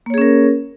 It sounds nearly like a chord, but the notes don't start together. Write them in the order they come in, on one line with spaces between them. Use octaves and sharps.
A#3 C#5 G#4 C#4 A#4